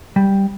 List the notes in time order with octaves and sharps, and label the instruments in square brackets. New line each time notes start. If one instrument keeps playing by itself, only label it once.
[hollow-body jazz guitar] G3